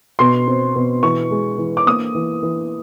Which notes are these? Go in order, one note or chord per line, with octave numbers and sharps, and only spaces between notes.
B2 C6
C4
B2
E3 C#6
G#3
E3
D6
A#3 D#6
E3
E3